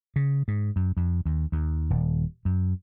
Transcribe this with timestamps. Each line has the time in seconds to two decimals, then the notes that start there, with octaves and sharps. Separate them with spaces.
0.16 C#3
0.48 G#2
0.76 F#2
0.97 F2
1.26 D#2
1.52 D#2
1.90 D#1
2.45 F#2